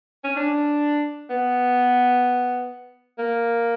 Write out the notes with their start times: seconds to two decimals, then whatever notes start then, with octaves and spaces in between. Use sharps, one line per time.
0.24 C#4
0.36 D4
1.30 B3
3.18 A#3